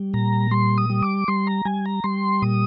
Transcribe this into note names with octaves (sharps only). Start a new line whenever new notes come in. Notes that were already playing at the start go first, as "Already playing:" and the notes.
Already playing: G3
A#2 A#5
G3 C6
D#6
G3
D6
G3 C6
A#5
G3 G#5
A#5
G3 C6
A#2 D#6